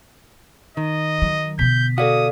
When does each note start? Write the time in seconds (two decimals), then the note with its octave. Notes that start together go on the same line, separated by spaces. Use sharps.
0.77 D#3 D#5
1.22 F#3
1.59 B2 D3 G6 B6
1.98 F#4 A4 D5 F5 D#6